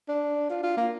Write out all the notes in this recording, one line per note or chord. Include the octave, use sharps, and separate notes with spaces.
D4
F4
F4
A#3